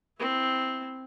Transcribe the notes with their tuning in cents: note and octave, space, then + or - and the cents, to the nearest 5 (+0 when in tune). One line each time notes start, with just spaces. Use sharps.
C4 +0 E4 +0